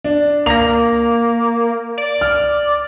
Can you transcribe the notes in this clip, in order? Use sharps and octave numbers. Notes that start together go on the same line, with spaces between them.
D4
A#3 A#6 F7
D5
F6